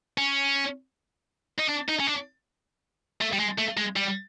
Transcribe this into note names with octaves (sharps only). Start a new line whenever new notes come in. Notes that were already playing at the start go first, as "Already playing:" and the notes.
C#4
D#4
D4
D#4
C#4
D4
A3
G3
G#3
A3
G#3
G3